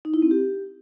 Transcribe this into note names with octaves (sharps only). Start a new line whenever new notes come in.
D#4
E4
C4
G4